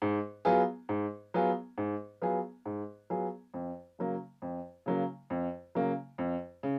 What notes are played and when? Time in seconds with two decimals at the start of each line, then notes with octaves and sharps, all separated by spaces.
0.02 G#2
0.45 F#3 B3 F4 G#4
0.89 G#2
1.34 F#3 B3 F4 G#4
1.78 G#2
2.22 F#3 B3 F4 G#4
2.65 G#2
3.10 F#3 B3 F4 G#4
3.54 F2
3.99 C#3 F#3 A#3
4.42 F2
4.86 C#3 F#3 A#3
5.30 F2
5.75 C#3 F#3 A#3
6.18 F2
6.63 C#3